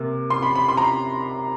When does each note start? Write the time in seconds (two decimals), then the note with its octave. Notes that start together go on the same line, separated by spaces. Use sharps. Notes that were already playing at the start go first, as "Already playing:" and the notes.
Already playing: C3 A#3
0.30 C6
0.42 B5
0.55 B5
0.68 C6
0.77 A#5